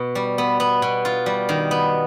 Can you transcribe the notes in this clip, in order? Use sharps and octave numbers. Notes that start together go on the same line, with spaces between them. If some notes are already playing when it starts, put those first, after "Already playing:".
Already playing: B2
G3
B3
B3
B2
F4
G3
D#3
B3